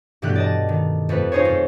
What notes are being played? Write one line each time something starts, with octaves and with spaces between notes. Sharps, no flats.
G2 B2 E3 A3 G4 F#6
D5 D#5 A5
D#3
F2 A3 B4
D#4 F4 G#4 C5 C#5
F2